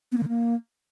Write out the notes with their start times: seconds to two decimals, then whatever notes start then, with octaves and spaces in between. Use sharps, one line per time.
0.12 B3
0.17 A#3
0.23 D3
0.28 A#3